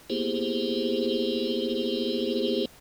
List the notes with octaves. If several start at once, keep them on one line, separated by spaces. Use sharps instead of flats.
A#3 B3 E4 G4 G#4 C5